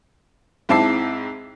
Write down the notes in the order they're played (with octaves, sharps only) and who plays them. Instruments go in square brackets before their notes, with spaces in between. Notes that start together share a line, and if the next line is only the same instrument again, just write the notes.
[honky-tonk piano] G#2 C4 E4 A5 D6 C7